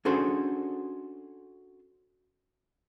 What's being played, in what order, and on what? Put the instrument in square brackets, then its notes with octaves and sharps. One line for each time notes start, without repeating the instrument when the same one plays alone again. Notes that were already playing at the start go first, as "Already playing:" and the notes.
[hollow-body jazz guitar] C#4 D4 F#4 G#4 A4 C5